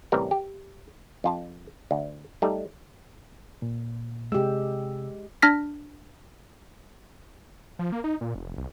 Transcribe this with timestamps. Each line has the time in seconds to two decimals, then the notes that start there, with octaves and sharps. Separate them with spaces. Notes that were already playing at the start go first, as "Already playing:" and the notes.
0.12 A1 C3 E3 G3 A#4
0.31 G4
1.24 F2 F4 A5
1.91 D2
2.42 G3 A3 D#4
3.62 A#2
4.32 C3 G#3 G4 E6
5.42 D4 F6 A#6 B6
7.79 F3
7.92 A#3
8.04 D#4
8.21 A#2
8.35 F1
8.57 C2